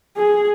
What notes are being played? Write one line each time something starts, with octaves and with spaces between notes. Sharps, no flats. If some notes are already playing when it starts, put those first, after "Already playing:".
G#4